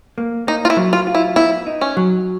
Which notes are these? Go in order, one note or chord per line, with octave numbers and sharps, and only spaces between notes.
A#3
A#3 D#4
F4
E4
F#3
F4
F4
E4
B3 E4
D#4
C#4
F#3